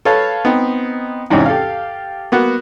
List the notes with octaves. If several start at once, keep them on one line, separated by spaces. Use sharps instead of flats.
A4 B4 C#5 F5 A5
B3 C4 D#4
E2 G#2 C3 C#4 D#4
G4 A4 F5
A#3 B3 F#4